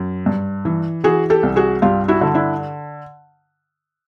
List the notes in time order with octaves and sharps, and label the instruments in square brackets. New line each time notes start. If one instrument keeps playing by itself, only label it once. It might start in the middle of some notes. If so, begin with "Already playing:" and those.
Already playing: [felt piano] F#2
G2
E3
E3 F#4 G#4
G4 A4
C2
F#4 G#4
G2 F4 G4
E4 F#4
D3
D4 E4